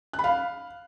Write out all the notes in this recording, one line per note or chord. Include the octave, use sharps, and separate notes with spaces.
F#6
B5
F5